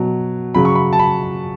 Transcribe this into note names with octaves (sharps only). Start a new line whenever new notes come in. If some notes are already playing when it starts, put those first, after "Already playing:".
Already playing: B2 F#3
C#3 F#3 B5
C#6
B5
A5
B5